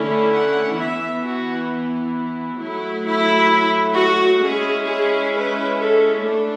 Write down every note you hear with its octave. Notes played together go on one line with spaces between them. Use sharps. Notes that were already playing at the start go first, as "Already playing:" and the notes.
Already playing: D3 A3 C#4 E4
F#5
E3 B3 E4 E5
F#4
F#3 A3 E4
E4
F#4
G#3 C#4 E4 G#4
G#4
B4
A4
A3 D4 A4